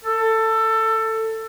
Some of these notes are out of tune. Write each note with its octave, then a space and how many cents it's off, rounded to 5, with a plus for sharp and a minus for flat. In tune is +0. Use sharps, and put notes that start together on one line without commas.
A4 +20